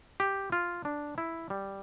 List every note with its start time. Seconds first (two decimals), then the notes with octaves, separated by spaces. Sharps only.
0.20 G4
0.52 F4
0.85 D4
1.18 E4
1.50 G3